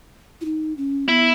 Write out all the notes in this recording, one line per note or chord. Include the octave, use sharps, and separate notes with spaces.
E4
D#4
C#4
B3 E4